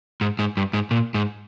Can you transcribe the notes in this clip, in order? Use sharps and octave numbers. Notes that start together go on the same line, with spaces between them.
G#2
G#2
G2
G#2
A#2
G#2